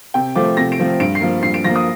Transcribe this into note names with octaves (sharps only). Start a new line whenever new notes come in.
C3 G5
F3 A3 C4 D6
C3 A#6
D7
F3 A3 C4
G2 D7
C7
F3 A#3
G2 C7
D7
F3 A#3 A#6
D#6